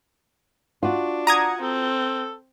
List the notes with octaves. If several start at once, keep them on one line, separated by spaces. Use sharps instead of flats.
D4 F4 F#4
F#5 A#5 D#6 G#6
C4 A4